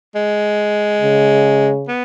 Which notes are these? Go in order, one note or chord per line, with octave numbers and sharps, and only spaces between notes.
G#3
C#3
B3